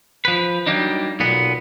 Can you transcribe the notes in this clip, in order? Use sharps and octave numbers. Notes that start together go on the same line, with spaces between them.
F3 B4
F#3 G3 A#3 D4 D#4
B1 A#2 B3